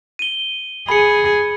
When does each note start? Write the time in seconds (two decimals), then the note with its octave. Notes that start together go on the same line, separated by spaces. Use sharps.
0.19 D#7 G7
0.89 G#4 B5 C#7